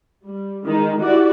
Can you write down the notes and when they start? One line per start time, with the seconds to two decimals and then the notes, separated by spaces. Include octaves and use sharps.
0.24 G3
0.65 D#3 G#3 D#4
1.00 E4 F#4 G4 D5